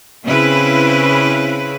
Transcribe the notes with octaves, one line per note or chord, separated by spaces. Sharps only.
C#3 C4 E4 B4